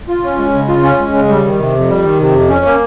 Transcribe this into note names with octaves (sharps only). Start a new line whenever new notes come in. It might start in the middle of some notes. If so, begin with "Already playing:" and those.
F4
C#4
G#3
C#3
F4
C#4
G#3
C#3
G3
D#3
C3
F2
G3
D#3
C3
F2
C#4
A#3